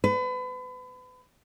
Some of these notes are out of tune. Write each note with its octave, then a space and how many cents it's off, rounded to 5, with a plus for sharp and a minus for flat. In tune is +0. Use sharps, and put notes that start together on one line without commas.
B4 +35